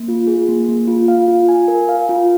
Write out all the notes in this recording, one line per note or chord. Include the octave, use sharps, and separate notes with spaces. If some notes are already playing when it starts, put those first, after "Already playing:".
Already playing: A#3
F4
G#4
A#3
A#3
F4
F5
F4
G#5
A#4
F5
F4